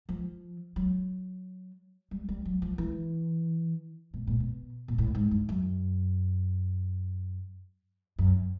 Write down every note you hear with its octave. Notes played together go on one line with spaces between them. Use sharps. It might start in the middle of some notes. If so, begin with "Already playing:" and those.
F3
F#3
G3
G3
F#3
F3
E3
B2
A#2
B2
A#2
A2
G#2
G2
F#2
F#2